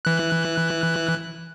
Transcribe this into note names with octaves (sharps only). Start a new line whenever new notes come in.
E3 F#6